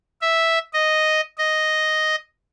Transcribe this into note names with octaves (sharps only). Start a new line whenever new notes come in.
E5
D#5
D#5